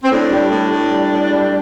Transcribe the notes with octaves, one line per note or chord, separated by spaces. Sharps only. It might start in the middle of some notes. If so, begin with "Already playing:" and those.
C4
A2 D4
G3
A2
A2
G3
A2
G3